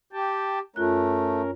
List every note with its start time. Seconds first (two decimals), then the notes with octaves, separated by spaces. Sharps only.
0.13 G4 G5 A5
0.76 F#2 A3 C#4 F4 A#4 F#6